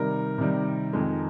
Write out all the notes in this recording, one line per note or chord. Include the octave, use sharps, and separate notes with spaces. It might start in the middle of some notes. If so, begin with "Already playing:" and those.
Already playing: C3 D#3 G3 A#4
C3 D#3 G3
F2 D#3 G#3